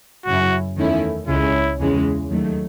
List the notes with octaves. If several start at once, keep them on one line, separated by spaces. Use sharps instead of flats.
F#2 C#3 F#3 C#4 E4 F#4
E2 D#3 A3 C#4 E4
C#2 C#3 G#3 C#4 E4
E2 C#3 E3 G#3 C#4
D#2 D#3 F#3 A3